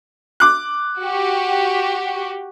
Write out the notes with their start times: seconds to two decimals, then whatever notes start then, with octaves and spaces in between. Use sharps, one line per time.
0.40 D6 F#6
0.99 F#4 G4